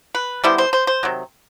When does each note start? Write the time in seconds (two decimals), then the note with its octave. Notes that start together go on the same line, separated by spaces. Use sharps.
0.15 B4
0.44 D3 G3 B3 E4 C5
0.58 C5
0.73 C5
0.87 C5
1.03 C3 D#3 F#3